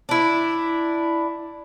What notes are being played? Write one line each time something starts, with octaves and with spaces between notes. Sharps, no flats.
D4 E4